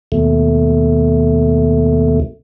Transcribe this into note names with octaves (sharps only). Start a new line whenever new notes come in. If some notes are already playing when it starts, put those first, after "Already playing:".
D#2 B2 A3